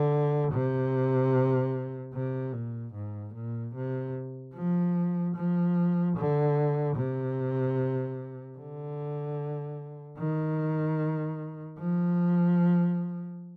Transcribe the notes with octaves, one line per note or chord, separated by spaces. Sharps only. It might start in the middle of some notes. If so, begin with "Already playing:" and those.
Already playing: D3
C3
C3
A#2
G#2
A#2
C3
F3
F3
D3
C3
D3
D#3
F3